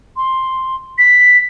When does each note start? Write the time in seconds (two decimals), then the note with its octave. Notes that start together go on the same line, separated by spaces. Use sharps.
0.17 C6
0.98 B6